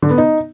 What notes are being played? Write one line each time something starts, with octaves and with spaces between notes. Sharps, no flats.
D3
B3
D#4